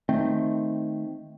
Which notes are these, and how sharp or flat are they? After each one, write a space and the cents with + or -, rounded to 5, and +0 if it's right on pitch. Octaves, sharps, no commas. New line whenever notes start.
D#3 +0 A3 +0 C4 +0